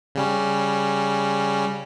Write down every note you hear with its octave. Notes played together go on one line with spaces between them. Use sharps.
C#3 G3 C#4